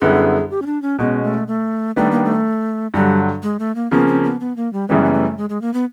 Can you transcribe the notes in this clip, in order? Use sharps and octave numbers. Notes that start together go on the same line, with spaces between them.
F#2 D3 G3 B3 E4 G#4
G4
C#4
D4
C#4
B2 G#3 B3 C#4
A3
A3
D#3 G3 A3 B3 D4
A#3
A3
G2 D3 F#3 G3
G#3
A3
A#3
C#3 F3 A#3 B3 C#4
C4
B3
B3
A#3
G3
F#2 C#3 E3 G3 G#3 B3
A#3
A3
G#3
G#3
A#3
B3